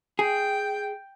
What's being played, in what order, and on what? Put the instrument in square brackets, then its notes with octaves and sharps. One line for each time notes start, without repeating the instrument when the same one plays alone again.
[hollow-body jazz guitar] G#4 [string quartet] G5